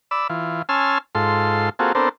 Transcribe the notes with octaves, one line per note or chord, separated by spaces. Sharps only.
D5 B5 E6
E3 F4
C#4 G#5 A5 C6 E6 F6
G#2 F4 A4 C6
A#3 C4 F4 F#4 G#4 A4
B3 C4 D4 A4 A#4 C5